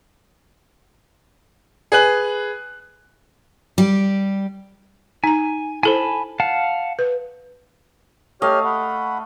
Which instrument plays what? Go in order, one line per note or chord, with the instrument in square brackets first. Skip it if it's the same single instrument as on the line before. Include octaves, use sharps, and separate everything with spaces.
[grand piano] G#4 B4 F#6 F#7
[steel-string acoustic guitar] G3 G4
[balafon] D#4 A#5 [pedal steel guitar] G#5
[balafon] E4 A4 C5 [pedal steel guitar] G#5 A5 B5
[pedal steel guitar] F5 F#5 A5
[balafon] B4
[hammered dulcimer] A3 D#5 F5 [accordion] G4 C#5 F6
[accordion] F#5 B5